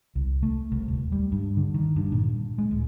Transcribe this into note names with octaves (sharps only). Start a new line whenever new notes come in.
C2
A3
C2
D#1
G3
G2
D3
D#3
G2
A#2
G#3
D1